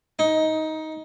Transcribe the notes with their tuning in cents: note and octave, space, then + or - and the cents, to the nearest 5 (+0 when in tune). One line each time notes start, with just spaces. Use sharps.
D#4 +15